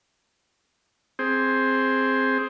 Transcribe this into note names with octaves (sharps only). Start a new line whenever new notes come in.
C4 G#4 C5